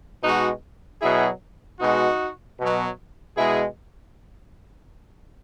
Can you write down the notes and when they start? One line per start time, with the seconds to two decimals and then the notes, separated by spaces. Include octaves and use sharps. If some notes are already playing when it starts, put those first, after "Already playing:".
0.23 B2 G#3 D#4 F#4
1.02 B2 F#3 E4 G#4
1.80 B2 G#3 D#4 F#4
2.58 B2 F#3
3.37 B2 G#3 E4 G#4